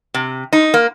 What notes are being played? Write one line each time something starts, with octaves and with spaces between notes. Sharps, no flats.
C3
D#4
A#3